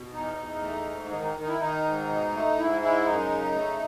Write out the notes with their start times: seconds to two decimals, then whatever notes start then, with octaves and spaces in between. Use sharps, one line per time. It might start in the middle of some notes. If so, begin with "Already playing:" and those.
Already playing: B2
0.13 E2 D#4
0.37 E2
0.62 A3
0.87 G#2
1.11 D#3 D#4
1.22 D#4
1.35 D#3
1.42 D#4
1.48 E4
1.59 D#3 D#4
1.84 G#2
2.08 B2
2.33 A3
2.57 G#2 E4
2.81 G#3 E4
3.06 F#2 D#4
3.30 C#3
3.55 A3